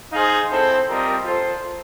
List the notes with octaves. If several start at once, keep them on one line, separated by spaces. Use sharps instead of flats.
D#4 G#4 C5 F5
C4 E4 A4 C5
G3 C4 F4 A#4 D#5
F4 A4 C5